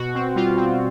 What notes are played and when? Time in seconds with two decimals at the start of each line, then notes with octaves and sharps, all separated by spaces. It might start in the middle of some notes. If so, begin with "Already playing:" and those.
Already playing: B2 F#4
0.15 C4
0.35 G3 F4
0.57 C4